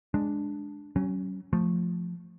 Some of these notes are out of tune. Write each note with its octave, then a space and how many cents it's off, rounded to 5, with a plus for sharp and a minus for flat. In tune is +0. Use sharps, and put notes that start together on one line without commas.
G#3 +0 D4 +0
F#3 +35 C#4 +0
F3 +5 A3 +0